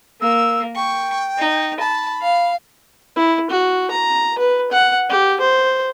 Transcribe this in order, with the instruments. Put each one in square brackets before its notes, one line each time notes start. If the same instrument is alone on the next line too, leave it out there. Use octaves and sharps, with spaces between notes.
[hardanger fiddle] A#3 [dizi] E6
[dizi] G5 [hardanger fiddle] C#6
[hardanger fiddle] D#4
[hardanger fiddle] A5 [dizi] B5
[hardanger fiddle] F5
[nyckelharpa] E4
F#4
A#5
B4
F#5
G4
C5